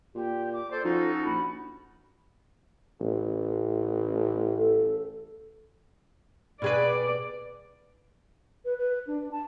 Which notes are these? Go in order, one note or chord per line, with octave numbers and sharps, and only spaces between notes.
A#2 G4
D6
A4 C5 D5
F3 C#4 D#4 F#4
A#1 B5
A1
A4
B2 G#4 B4 D5
B4
B4
D4
A5